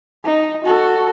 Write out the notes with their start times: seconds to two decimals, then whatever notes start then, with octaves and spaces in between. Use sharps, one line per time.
0.24 D#4
0.64 F#4 A4